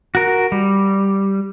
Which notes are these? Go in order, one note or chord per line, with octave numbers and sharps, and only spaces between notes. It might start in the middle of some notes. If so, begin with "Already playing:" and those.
F#4 A#4
G3